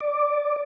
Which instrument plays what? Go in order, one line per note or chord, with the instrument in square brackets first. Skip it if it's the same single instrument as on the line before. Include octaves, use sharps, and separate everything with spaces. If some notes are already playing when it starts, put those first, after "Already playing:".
[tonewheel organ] D5